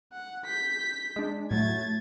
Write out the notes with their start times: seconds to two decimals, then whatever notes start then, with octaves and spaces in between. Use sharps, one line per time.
0.13 F#5
0.46 G6 B6
1.16 G#3 D4
1.51 A2 F#3 A3 G#6 A6